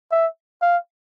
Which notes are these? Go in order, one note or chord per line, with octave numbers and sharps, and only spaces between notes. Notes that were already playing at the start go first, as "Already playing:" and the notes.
E5
F5